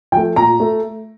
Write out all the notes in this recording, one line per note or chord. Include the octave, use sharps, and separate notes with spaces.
F3 A3 G5
A#2 A#5
A3